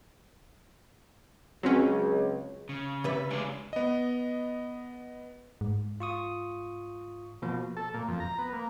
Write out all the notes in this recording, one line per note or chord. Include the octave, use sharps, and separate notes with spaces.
C#2 F#3 C4 C#4
C#3
C3 B4 E5
C#2 G#3 D4 G#4
B3 D#5
G#2
F4 C#6 D#6
B2 F3 A#3
A4
A#2
F2
A#5
B3
A#3